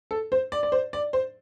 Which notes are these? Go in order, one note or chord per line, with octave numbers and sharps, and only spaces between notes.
A4
C5
D5
D5
C5
D5
C5